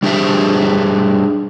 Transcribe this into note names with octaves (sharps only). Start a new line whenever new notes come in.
G3 D4 G4 G#4 C5 E5